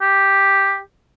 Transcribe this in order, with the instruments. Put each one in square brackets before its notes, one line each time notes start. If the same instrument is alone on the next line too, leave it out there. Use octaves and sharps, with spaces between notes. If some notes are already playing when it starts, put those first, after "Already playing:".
[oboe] G4